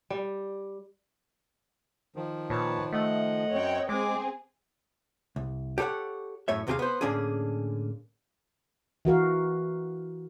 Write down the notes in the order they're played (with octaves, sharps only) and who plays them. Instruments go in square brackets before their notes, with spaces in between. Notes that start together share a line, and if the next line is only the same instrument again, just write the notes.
[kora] G3
[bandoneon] D#3 F3
[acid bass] A#2 [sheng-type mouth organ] B4 C#5 A5
[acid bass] A3 [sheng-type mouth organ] D#5 F#5
[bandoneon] F#2 C4 [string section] C#5 G5
[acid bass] G#3 [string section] C4 G#4 [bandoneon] D6
[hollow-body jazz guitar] C2
G4 A4 B4 C#5 F#5
F#2 A2 C#5 E5
D#2 C3 A#3 G4 G#4 F5
B3 C5
A2 D3 A#3 C#4 D4 G#4
[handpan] E3 F#4 A#4 F5